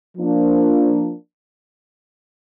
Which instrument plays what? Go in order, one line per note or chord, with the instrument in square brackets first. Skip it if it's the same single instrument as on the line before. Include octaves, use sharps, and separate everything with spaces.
[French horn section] F3 A#3 D4